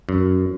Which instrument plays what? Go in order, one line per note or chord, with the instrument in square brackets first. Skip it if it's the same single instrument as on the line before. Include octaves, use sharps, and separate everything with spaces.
[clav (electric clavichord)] F#2